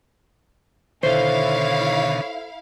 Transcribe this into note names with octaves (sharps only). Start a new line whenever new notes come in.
B2 D3 D#3 E4 A4 C5 C#5 F5